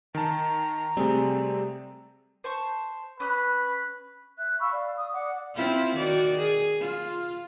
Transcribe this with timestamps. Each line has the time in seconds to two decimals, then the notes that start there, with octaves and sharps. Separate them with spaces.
0.15 D#3 A5 A#5
0.97 C3 G3 A3 C4 G#4
2.44 C5 A5 C#6
3.20 C#4 B4 D#6 F#6
4.38 E5 F#6
4.60 F5 B5 C#6 E6
4.72 D5 F5
4.97 D#6
5.12 D5 F#5 D6
5.55 C4 E4 F4
5.96 D#3 F#4 D5
6.37 G#4
6.80 F4